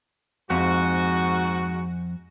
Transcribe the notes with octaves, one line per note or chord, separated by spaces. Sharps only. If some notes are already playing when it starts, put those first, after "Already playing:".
F2 G#2 F#4